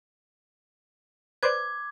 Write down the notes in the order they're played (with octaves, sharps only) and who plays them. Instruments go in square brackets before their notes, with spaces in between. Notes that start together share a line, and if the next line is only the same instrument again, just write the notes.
[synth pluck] B4 C5 D5 [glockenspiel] D6 G#6